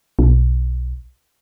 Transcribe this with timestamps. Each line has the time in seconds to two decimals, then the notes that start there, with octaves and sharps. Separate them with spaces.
0.19 B1